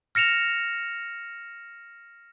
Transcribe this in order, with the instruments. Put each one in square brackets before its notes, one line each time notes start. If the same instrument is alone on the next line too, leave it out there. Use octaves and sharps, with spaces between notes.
[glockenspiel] F6 A#6 C#7 E7 F7